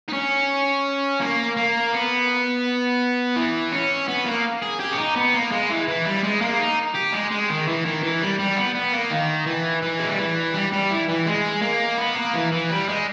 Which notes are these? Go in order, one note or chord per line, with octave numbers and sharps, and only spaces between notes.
D#4
C#4
A#3
A#3
B3
E3
C#4
B3
A#3
G#4
G4
C#4
D#4
B3
A#3
G#3
E3
E3
G3
G#3
A#3
D#4
G4
G#3
G#3
D#3
E3
D#3
E3
G3
G3
B3
B3
A#3
D#3
E3
E3
G#3
G3
E3
G3
G3
E3
E3
G#3
A#3
B3
A#3
E3
E3
G3
G#3